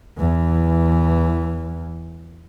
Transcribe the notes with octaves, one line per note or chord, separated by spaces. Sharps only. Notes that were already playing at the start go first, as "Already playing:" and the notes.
E2 E3